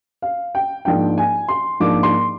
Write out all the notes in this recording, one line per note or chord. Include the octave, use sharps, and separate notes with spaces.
F5
G5
G#2 F3 A#3 D4 G5
G#5
C6
G#2 F3 A#3 D4 D6
C6